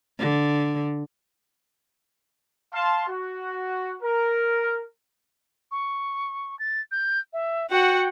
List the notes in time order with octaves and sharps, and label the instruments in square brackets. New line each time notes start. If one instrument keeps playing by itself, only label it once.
[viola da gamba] D3
[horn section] F5 A5 C6
F#4
A#4
[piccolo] C#6
A6
G6
E5
[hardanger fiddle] F#4 F#5 [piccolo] G5